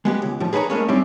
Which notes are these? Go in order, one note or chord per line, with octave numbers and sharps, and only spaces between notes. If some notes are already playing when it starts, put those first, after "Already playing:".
G#3 B3 G4
C#2
A2 F3
G#4 B4 C#5 G#5 A#5
A2 G#3 A#3 C#4
G#2 G3 C4 C#4 E4